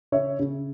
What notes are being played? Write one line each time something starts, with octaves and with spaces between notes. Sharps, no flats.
C#3 C#5 E5
C#3